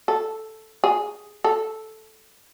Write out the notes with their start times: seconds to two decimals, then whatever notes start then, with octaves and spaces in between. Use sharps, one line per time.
0.08 A4
0.84 G#4
1.44 A4